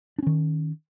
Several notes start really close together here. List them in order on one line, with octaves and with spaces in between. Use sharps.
D4 C#4 D#3